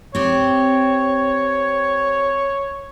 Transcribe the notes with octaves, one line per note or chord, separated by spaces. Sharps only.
C4 G4 C#5